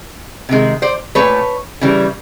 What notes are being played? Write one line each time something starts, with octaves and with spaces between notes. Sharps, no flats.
C3 D#3 G#3
C5 D5
A#2 F#3 A3 B4 C#5
C#3 E3 G3